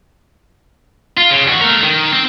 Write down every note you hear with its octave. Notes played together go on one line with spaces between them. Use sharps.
F4
C#3
D#2 F#4
A3 A#4
D#3
C4